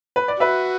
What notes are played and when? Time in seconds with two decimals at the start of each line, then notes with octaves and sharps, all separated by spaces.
0.16 B4
0.28 D5
0.40 F#4 B4 E5